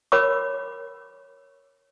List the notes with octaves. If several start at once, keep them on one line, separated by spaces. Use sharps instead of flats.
A#4 C#5 B5 D6